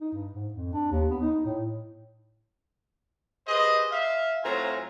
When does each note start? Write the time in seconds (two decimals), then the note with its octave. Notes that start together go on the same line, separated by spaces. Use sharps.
0.01 D#4
0.13 G2
0.33 G#2
0.54 F2
0.73 D4
0.92 D#2
1.11 B3
1.22 D#4
1.45 A2
3.48 G4 G#4 B4 C5 D#5
3.91 E5 F5
4.44 A2 F#3 C4 F4 G#5 A#5